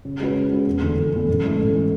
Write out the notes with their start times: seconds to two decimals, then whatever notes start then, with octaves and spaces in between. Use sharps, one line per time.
0.05 C#3
0.20 G#3 C#4 F#4 B4
0.36 C#3
0.51 G#3 C#4 F#4 B4
0.67 E1
0.82 E2 D3 A3
0.98 E1
1.12 E2 D3 A3
1.28 A1
1.44 G#2 E3 A3
1.59 A1
1.74 E3 A3